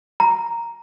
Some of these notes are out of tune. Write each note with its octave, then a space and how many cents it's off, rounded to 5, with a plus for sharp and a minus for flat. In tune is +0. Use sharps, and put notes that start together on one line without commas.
A#5 +0